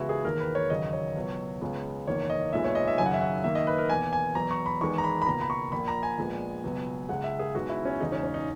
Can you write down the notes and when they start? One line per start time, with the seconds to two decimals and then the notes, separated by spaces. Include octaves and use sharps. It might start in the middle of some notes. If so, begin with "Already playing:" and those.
Already playing: C#2 C#3 E3 G#3 B3 E4 F#4
0.09 G#4
0.24 E1 D#2 D#3 A#3 A#4
0.40 B4
0.55 C#5
0.70 E1 D#2 C#3 F#3 D#5
0.93 C#5
1.15 C#2 B2 F#3
1.61 C#2 C#3 G#3 B3
2.07 F#1 E2 D#3 A#3 C#5
2.30 D#5
2.53 B1 A#2 G#3 B3 E5
2.64 C#5
2.75 D#5
2.87 E5
2.98 G#1 F#2 C#3 F#3 G#5
3.06 F#5
3.14 E5
3.21 F#5
3.44 D#2 D#3 A#3 E5
3.55 D#5
3.67 B4
3.78 A#4
3.90 E2 B2 A#3 G#5
4.13 G#5
4.35 E2 B2 F#3 A#5
4.51 C#6
4.66 B5
4.81 E2 D#3 G#3 B3 C#6
4.98 A#5
5.04 B5
5.22 B5
5.26 C#2 B2 A#3 A#5
5.41 B5
5.50 C#6
5.72 A#1 A#2 A#3 B5
5.88 A#5
6.03 G#5
6.18 A#1 A#2 G#3 B3
6.63 C#2 B2 F#3 B3
7.09 C#2 C#3 G#3 F#5
7.24 E5
7.39 G#4
7.54 B1 B2 G#3 F#4
7.70 E4
7.85 C#4
8.00 E1 E2 C#3 G#3 D#4
8.12 C#4
8.23 C#4
8.34 D#4